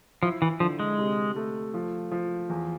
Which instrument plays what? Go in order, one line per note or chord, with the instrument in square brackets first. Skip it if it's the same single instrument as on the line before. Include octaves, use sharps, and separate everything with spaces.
[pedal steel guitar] F3 [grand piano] E4
[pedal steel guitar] E3
[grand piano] D3 [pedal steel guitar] F3
[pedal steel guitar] G#3
[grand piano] C3
A3
F3
F3
E2